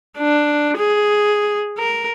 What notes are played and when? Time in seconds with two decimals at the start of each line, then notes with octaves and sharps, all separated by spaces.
0.18 D4
0.77 G#4
1.79 A#4